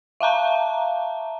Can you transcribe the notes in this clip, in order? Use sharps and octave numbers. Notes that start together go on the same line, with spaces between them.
E5 F5 A5 A#5